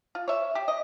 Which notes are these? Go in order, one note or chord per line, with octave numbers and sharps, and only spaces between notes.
F4
C#5 E5
G4
D#5